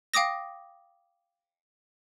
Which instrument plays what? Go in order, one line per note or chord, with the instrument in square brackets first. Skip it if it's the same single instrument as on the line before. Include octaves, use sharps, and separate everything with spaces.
[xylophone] F5 G5 D6 D#6 A#6